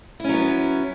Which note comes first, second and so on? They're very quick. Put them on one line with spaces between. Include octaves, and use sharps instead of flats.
E4 C#4 F#3 B3